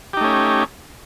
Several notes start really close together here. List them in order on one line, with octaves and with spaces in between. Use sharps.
G4 D#4 A3 C#4